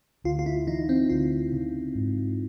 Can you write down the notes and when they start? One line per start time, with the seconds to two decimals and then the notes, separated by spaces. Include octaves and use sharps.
0.24 D2 F4
0.39 F4
0.46 E4
0.67 E3 D#4
0.89 C4
1.10 D2 F4
1.53 C#3
1.95 G#2